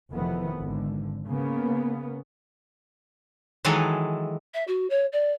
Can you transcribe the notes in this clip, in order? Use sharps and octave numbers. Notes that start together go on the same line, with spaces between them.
F1 F2 D#3 E3 B3
G#1 D3
C#3 A#3 B3
D#3 E3 F#3 G#3 G#4 A4
E5
F#4
C#5
D5